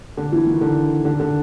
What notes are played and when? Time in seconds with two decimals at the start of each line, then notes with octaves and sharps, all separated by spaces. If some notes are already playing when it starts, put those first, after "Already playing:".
0.17 D3
0.32 E3
0.47 D#3
0.61 D3
1.05 D3
1.20 D3